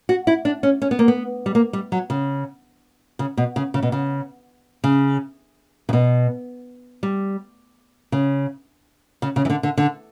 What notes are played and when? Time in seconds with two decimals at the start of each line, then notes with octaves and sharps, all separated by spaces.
0.09 F#4
0.27 E4
0.45 D4
0.63 C#4
0.82 C#4
0.91 B3
0.99 A#3
1.08 B3
1.46 G3
1.55 A#3
1.73 G3
1.92 F#3
2.10 C#3
3.19 C#3
3.37 B2
3.56 C#3
3.74 C#3
3.82 B2
3.92 C#3
4.84 C#3
5.89 C#3
5.93 B2
7.03 G3
8.12 C#3
9.22 C#3
9.36 C#3
9.45 E3
9.50 D3
9.63 D3
9.77 D3